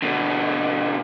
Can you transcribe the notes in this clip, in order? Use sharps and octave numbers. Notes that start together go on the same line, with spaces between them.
B2 D3